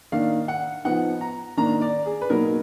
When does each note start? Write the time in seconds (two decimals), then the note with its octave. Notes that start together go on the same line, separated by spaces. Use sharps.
0.12 D#3 A#3 D4 F5
0.48 F#5
0.84 F3 B3 D#4 F#5
1.21 A#5
1.57 D#3 A#3 D4 A#5
1.81 D5
2.06 G#4
2.21 B4
2.30 B2 F#3 A#3 D#4 A#4